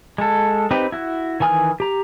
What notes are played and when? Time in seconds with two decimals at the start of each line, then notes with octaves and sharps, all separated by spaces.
0.18 G#3 A4
0.71 C4 D#4 G4 B4
0.92 E4 F#4
1.40 D#3 E3 G#5 D#6 F6
1.80 G4 A#5